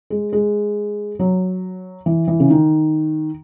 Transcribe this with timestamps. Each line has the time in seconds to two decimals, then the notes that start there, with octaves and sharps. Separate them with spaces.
0.10 G#3
0.33 G#3
1.19 F#3
2.06 E3
2.28 E3
2.40 C#3
2.50 D#3